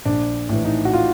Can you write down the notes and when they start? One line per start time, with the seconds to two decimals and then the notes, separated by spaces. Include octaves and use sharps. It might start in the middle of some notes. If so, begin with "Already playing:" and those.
0.05 A#1 D4
0.49 A2 E3
0.65 D#4
0.85 F#4
0.93 F4